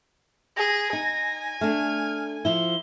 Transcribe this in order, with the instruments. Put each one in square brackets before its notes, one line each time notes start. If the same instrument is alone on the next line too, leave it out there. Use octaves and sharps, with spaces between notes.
[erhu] G#4 [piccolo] A#6
[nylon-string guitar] D#4 [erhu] G#5
[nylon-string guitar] A3 D4 [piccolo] F6
[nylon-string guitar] F3 E4 [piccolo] G7